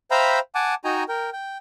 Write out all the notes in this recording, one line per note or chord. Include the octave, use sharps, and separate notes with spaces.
C5 E5 F5 G5 A#5 B5
F#5 G#5 A5 D6
D#4 F#4 D#5 G5 G#5 A#5
A#4 G5
G5